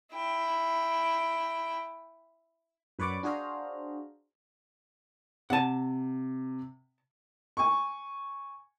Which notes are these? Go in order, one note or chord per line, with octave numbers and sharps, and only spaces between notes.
E4 G5
F#2 B4 C#5 D5 F#5 D6
D4 F#4 G#4 C5 F5 A#5
C3 F#5 A5
G#5 C#6